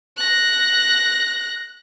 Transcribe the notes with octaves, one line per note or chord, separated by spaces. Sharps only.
F#6 A#6